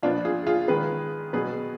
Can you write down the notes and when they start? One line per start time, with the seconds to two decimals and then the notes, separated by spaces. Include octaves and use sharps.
0.03 A#2 F3 B3 D4 F4
0.25 F4 G#4
0.47 F4 G#4
0.68 D#3 G#3 B3 G#4 B4
1.33 B2 F#3 B3 G#4 B4